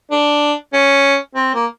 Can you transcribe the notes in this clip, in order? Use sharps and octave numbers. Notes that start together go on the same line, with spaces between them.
D4
C#4
C4
A#3